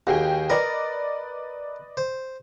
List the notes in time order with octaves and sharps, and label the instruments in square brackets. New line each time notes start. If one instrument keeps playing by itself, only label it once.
[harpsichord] D#2 [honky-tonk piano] F#4 G#4 G5
[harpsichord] A#4 D#6 [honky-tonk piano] B4 D5 D#5
[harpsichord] C5